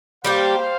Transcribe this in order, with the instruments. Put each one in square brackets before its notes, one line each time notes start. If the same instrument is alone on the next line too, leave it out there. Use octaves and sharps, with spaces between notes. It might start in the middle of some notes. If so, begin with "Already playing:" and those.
[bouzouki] G3 A#3 G4 [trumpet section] C5 F5